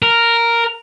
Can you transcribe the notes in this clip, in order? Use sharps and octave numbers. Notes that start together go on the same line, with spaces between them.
A#4